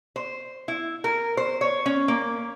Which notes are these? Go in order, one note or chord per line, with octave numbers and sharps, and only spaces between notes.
C5
E4
A#4
C5
C#5
C#4
A#3